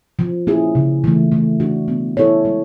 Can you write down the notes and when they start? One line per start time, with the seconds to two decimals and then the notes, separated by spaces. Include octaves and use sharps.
0.19 F3
0.47 A#3 C#4 E4 G#4
0.75 C#3
1.04 E3 A3
1.32 A3
1.60 D4 F#4
1.88 B3
2.17 E4 A4 C#5
2.45 G#3